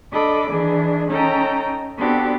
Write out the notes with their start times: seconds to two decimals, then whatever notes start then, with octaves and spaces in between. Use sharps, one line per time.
0.11 D4 A4 D#5 B5 D6
0.50 D#3 E3 D4 G#4
1.08 C#4 D#4 A4 G5 A#5
1.97 B3 C4 D4 F#4 G4 A4